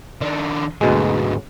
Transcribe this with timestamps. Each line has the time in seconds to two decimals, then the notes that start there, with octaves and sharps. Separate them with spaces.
0.21 D#3 D4
0.81 D2 G#2 B2 F#3 G#3